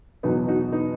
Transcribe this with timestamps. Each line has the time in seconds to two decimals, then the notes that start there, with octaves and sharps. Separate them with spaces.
0.23 E2 B2 F#3 B3 D#4
0.48 D#4 F#4
0.72 B3 D#4